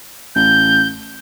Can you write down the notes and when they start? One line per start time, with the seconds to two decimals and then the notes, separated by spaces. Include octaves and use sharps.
0.35 A1 G6